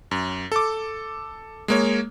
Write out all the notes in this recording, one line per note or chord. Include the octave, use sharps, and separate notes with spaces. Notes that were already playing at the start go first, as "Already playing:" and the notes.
F#2
A4 D6
G#3 A#3 C#5